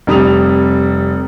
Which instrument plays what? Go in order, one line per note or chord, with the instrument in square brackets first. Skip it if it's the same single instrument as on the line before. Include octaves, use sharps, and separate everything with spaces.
[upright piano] F1 G3 D#6 F7